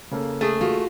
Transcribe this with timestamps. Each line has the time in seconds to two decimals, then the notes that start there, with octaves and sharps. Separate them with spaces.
0.11 C#3 A#3 A4
0.41 A3 G#4
0.61 F4 F#4